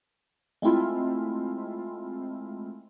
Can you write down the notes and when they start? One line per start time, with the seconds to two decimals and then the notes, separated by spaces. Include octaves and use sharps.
0.62 G#3 A3 C4 E4 F4